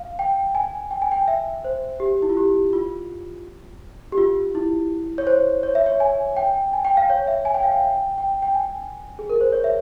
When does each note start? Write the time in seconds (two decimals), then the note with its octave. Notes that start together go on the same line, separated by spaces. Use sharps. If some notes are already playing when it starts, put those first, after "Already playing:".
Already playing: F5
0.19 G5
0.55 G#5
0.91 G5
1.02 G#5
1.12 G5
1.28 E5
1.64 C5
2.00 G4
2.22 E4
2.30 F4
2.37 G4
2.73 F4
4.12 G4
4.18 F4
4.55 E4
5.18 C#5
5.27 C5
5.63 C#5
5.75 E5
5.86 C#5
6.00 G#5
6.37 G5
6.73 G#5
6.85 G5
6.97 F5
7.09 C#5
7.27 E5
7.45 G#5
7.54 G5
7.63 F5
7.72 G5
8.18 G5
8.42 G5
8.55 G#5
9.19 G#4
9.30 A#4
9.41 C5
9.53 C#5
9.64 E5